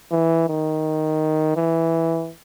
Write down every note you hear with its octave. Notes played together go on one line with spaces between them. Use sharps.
E3
D#3
E3